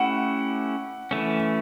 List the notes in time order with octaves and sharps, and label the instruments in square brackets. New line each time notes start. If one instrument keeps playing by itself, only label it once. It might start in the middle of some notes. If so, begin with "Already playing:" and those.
Already playing: [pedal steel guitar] A3 C#4 E4 G4 [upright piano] F#5
[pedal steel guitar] E3 A3 C#4